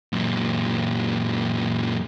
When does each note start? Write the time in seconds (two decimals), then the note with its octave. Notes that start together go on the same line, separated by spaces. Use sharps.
0.13 F#2 A#2